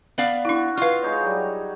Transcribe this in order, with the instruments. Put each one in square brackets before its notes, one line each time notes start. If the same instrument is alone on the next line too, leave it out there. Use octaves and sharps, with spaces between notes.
[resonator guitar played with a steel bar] B3 D5 F5
[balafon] D4 E4 [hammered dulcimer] F#4
[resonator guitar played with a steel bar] F4 F5 [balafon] B4 C#6 [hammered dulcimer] D#5
[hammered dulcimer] G#3 D#4 C#5
F#3 G3